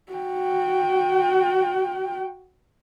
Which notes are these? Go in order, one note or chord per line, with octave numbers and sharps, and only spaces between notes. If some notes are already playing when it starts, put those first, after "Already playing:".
F#4 G5